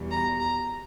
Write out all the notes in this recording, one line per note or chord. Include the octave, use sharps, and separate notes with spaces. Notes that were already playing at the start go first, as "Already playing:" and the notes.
Already playing: E2 B2 G3
A#5
A#5